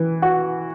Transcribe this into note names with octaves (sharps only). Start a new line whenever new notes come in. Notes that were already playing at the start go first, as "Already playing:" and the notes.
Already playing: E3
F#4